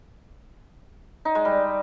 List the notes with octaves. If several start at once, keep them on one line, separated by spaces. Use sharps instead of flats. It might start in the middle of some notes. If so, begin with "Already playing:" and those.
D#4
G#3
G3